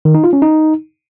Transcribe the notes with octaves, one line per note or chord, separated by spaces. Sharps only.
D#3
D#4
F4
C#4
D#4